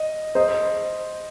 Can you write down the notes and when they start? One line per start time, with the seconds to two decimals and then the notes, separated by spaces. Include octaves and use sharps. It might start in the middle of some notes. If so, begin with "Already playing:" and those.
Already playing: D#5
0.35 C5 D#5